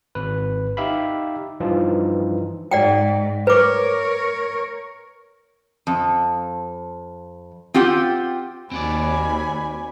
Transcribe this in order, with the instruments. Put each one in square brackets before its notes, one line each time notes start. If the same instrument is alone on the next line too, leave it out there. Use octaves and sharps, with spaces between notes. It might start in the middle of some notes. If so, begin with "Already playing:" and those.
[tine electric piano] G#1 B4
D#4 G4 E5 F5 B5
G2 E3 F3 D#4 F4
[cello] G#2 [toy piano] D5 F#5 G5
[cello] A#4 C#5 [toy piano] B4 D6
[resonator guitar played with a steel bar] F2
C4 F4 G4 F#5
[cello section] D#2 [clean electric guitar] C4 F#4 D5 [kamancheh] G#5 B5